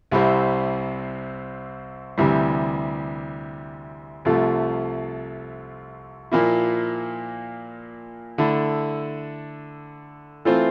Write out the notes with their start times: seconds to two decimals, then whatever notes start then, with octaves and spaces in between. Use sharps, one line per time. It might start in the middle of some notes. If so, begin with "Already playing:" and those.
0.11 C2 C3 G3 C4 E4
2.18 D2 C3 E3 G3
4.25 C2 C3 F3 A3
6.32 A#2 F3 A#3 E4
8.38 D3 A3 E4
10.45 E3 A3 C4 F4 C5